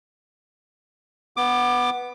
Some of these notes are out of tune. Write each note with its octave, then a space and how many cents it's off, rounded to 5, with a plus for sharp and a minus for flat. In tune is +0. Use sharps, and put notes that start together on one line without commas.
B3 +0 D6 +20